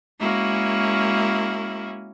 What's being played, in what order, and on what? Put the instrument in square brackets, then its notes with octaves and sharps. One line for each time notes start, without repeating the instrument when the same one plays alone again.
[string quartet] G#3 A#3 C#4 E4 F#4